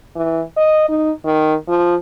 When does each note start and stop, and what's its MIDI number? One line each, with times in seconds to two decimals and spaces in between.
0.16 0.42 52
0.57 0.86 75
0.89 1.11 63
1.25 1.54 51
1.68 1.95 53